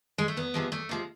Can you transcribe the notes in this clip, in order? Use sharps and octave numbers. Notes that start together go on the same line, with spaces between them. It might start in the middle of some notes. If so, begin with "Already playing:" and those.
G#3
A3
E2 B3
C3 F3 G#3
E2 A3
C3 F3 G#3